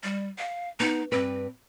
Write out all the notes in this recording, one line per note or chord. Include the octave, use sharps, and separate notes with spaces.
G3
F5
B3 D#4
G2 C4 B4